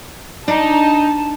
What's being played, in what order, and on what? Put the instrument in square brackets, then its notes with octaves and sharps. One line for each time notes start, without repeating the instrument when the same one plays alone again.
[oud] D4 [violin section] D#4 [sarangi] A5